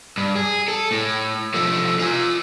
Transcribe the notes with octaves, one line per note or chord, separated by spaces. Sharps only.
G2
G#4
A4
A2
F3 A3
F4 G#5